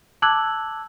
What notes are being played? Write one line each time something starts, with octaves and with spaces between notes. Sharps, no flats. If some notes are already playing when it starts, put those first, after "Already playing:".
A5 D6 E6 F#6 G#6 F#7